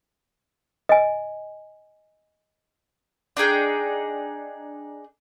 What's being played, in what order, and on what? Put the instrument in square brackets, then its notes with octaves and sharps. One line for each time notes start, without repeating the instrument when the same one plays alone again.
[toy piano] D#5 G#5
[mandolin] D4 D#4 G#4 G5